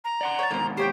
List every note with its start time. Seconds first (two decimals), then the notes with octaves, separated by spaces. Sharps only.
0.05 A#5
0.21 D5 F#5 C6
0.39 C#5 G5 A5
0.51 D#2 G#2 B2 A#3 C5
0.77 G4 C5 C#5 G5